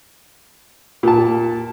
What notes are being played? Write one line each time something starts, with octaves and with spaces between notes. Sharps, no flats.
A#2 A5